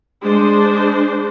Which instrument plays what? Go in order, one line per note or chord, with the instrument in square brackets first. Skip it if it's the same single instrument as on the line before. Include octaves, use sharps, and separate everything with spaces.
[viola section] G#3 D4 C5